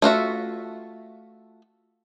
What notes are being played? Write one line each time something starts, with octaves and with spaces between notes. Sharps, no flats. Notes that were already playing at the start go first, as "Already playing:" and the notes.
A3 F4 F#4 E5